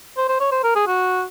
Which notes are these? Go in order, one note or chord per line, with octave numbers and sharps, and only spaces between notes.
C5
C5
C#5
C5
A#4
G#4
F#4